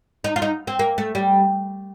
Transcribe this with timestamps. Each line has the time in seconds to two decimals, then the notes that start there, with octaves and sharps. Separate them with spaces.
0.24 D#4
0.36 F4
0.42 D#4
0.67 C4
0.79 A#3
0.98 A3
1.15 G3